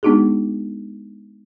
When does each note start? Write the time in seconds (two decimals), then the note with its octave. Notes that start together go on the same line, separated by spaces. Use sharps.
0.03 G#3 B3 D4 D#4 F#4 G#4